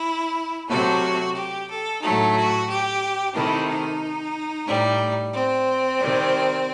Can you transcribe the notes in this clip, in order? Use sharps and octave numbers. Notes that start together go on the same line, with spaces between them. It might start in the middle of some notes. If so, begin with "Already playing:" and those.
Already playing: E4
C3 F#3 A3 F#4
G4
A4
A2 F#3 A3 D#4
F#4
G4
C3 D#3 A3 E4
D#4
A2 G3
C4
C3 D#3 G3